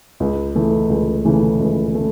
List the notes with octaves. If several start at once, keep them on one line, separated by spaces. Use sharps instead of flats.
C#2
C#3 E3 A3
C#2
C#3 E3 A3
C#2
A3